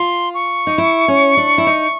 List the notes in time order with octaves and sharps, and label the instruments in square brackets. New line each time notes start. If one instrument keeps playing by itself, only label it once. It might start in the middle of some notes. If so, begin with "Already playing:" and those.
Already playing: [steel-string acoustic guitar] F4 [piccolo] C6
[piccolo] C#6
[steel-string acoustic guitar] D#4
E4
C#4
D4
E4
D#4